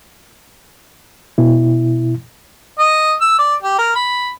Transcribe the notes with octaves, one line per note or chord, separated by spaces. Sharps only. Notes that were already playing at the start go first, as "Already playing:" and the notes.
B2 E4
D#5
E6
D5
G4
A#4
B5